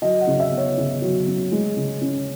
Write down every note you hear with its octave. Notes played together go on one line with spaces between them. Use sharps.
F#3 D#5
F#5
C#3
E5
B3
C#5
C#3
F#3
C#3
G#3
C#3
C#4